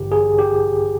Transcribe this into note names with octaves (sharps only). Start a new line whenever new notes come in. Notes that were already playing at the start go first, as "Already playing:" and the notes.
Already playing: A1 G2 D3 G4
G#4
G4